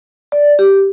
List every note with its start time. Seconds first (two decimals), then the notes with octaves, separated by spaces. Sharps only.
0.32 D5
0.59 G4